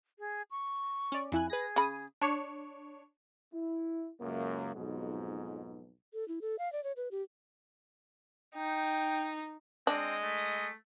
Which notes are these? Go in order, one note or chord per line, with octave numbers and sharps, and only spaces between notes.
G#4
C#6
C#4 D5
F2 E4 G#5 F#6
G#4 B4 A#6
C#3 B5 D#6
D4 C#5
E4
C#2 F#2 A#3
B1 F2 G#2 B2
A4
E4
A4
F5
D5
C#5
B4
G4
D#4 G5
G#3 C4 D4 D#5
A3